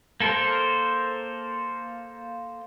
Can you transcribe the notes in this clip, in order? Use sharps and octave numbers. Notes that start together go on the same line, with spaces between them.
A#3 A4 A#4 C5